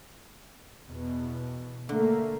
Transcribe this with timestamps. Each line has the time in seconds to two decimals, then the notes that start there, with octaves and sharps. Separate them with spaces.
0.86 E2 B2
1.89 D3 A3 A#3